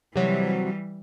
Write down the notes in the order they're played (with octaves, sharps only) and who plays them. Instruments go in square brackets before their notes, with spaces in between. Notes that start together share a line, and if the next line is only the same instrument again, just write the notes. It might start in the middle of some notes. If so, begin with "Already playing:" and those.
[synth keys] C3 F#3 [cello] E3 G3